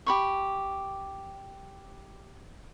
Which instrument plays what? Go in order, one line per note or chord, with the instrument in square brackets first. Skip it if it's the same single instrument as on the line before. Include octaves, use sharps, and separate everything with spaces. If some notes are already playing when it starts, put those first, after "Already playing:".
[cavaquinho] G4 B5 C#6